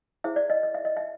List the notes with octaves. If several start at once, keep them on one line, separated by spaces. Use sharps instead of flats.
E4 G#4 C5 E5
D5
D#5
D#5
E5
D#5
E5